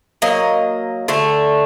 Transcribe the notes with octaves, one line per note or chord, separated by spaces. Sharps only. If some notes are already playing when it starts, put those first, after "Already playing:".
F#3 A#3 D#5
D3 A3